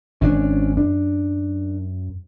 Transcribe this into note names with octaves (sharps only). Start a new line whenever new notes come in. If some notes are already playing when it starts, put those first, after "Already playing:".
G#1 C3 C#4 D4
F#2 D4